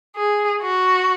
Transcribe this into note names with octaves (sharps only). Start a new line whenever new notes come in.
G#4
F#4